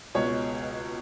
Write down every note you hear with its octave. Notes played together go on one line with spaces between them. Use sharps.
C#2 B2 G#3 C#5